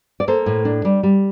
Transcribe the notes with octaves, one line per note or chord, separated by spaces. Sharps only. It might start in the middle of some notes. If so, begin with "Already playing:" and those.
D5
A#3 A4 C5
A2
D4
G3
G3